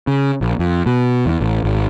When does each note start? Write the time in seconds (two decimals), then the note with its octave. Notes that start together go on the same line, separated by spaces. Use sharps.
0.07 C#3
0.41 A#1
0.59 F2
0.86 B2
1.26 E2
1.41 A1
1.64 G#1